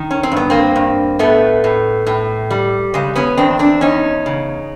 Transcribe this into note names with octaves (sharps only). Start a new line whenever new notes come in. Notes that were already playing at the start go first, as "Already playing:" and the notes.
Already playing: D#3
C#4
C4
G2 B3
A#3 C4
G2
A2 A3 B3
A2
A2
G3
C#3 G#3
B3 C#4
E2 C4 D4
C4 D4
E2 C#4 D#4
C#3